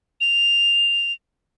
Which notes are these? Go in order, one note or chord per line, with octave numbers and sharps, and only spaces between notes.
F7